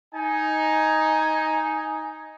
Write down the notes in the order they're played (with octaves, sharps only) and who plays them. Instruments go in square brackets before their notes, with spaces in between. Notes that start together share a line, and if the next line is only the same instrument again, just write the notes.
[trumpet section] D#4 G#5